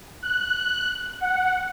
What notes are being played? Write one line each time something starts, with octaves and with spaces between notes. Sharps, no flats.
F#6
F#5